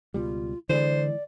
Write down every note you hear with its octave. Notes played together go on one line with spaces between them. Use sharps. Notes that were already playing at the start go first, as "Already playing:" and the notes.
C#2 B2 G3 F4
D3 E3 F#3 G#3 C5 D5